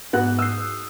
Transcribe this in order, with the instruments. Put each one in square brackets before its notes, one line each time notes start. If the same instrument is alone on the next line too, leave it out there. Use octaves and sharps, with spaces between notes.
[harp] G#2 [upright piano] B3 F#4 F#6
[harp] D#6 G6 [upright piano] E6 C7